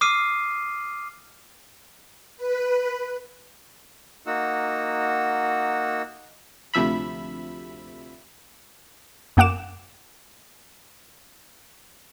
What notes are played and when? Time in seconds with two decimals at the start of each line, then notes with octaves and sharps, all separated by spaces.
0.01 D6 D#6 F6 C7 D#7
2.37 B4
4.27 A#3 D#4 F#4 F#5 E6
6.74 D2 C3 F3 E5 B5
9.37 F#2 A#3 F#5 D6 E7